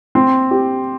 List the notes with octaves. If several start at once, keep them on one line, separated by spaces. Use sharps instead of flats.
C4
G4